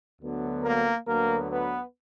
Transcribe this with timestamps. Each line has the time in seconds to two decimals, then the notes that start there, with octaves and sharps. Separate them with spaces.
0.20 D2 D3 F#3 B3
0.63 A#3 A#4
1.07 D2 D3 F#3 A#3 B3 A#4
1.51 B3 B4